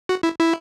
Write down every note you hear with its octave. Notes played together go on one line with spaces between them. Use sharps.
F#4
E4
E4